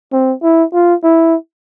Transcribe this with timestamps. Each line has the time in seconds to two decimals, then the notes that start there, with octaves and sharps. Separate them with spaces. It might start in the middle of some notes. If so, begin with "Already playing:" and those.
0.12 C4
0.42 E4
0.73 F4
1.04 E4